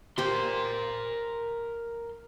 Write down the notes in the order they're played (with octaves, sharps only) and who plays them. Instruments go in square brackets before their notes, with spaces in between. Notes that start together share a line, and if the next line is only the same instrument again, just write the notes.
[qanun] G4 C5 [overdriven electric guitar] A#4 C6